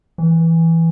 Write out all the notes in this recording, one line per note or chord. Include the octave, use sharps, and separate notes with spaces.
E3